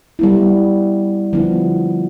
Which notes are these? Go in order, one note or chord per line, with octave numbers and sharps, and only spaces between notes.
G3 B3 E4
D3 F3 B3 E4